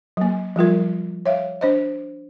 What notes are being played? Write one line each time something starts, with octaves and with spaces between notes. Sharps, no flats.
F#3 A#3
F3 G3 F4 A#4
C#5 E5 F5
D4 C5 D#5